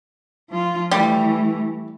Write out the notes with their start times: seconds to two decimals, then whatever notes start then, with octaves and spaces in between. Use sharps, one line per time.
0.50 F3 F4
0.91 E3 G3 A3